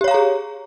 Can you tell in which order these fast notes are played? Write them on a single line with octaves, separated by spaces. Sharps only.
G4 C#5 F5 A#5 G#4